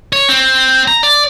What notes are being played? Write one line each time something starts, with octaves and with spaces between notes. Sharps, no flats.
C#5
C4
A#5
D5